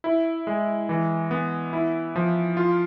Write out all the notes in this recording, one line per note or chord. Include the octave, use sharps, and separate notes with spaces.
E4
G#3
E3
B3
E4
F3
F4